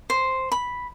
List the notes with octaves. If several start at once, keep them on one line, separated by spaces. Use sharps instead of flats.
C5
B5